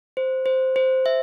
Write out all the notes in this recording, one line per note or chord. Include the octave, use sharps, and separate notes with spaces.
C5
C5
C5
E5